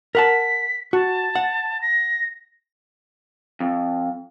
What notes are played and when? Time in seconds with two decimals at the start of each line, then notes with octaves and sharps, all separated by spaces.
0.15 A#4 F#5 A5 B6
0.93 F#4 A5
1.35 F#5
1.81 A#6
3.60 F2